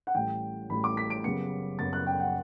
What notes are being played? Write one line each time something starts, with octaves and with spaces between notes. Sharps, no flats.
F#5
A1 A2 G3 G5
A1 A2 G3 B5
D6
B6
D7
F#1 F#2 C#3 G3 B3 C#7
F#1 F#2 C#3 G3 B3 A6
F#6
G5
F#5